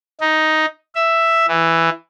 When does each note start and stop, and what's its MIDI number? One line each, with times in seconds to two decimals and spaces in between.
0.21 0.66 63
0.95 1.46 76
1.48 1.90 52